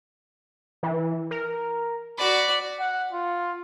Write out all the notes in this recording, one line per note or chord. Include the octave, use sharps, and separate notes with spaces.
E3
A#4
F#4 D5 B5
F#5
F4